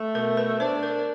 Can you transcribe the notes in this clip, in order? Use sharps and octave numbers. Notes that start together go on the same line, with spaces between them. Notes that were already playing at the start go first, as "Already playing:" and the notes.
Already playing: A3
B2 A#4
B4
D4 C5
A#4